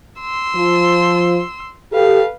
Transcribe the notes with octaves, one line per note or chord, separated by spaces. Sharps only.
C6 E6
F3
G4 A4 B4 F5